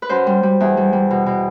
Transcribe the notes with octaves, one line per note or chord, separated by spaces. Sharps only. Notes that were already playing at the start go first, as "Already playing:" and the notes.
B4
F#2 C5
G3
G3
E2
G3
G3
B2
B2